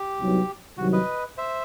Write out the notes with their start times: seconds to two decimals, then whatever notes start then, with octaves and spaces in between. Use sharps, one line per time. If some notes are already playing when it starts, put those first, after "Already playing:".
Already playing: G4
0.18 C2 C3 F#3 B3 D#4
0.77 C2 C3 D#3 F#3 F#4
0.93 B4 D#5
1.38 C5 E5